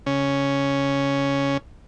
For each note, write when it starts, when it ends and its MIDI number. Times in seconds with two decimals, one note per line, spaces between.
0.06 1.57 49
0.06 1.57 61